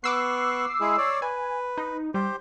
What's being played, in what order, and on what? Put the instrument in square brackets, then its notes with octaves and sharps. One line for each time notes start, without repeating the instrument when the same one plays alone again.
[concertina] B3 C#6 F#6 [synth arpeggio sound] D6 E6 C7
[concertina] G#3 E4 G#4
C#5 D5
[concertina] B4 [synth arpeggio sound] G#5
[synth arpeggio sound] D#4
[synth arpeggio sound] G3 [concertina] G4 C5